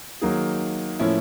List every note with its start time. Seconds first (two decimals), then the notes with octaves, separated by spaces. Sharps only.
0.22 D#3 F#3 A#3 D#4 G#4
0.99 A2 F3 A#3 C#4 E4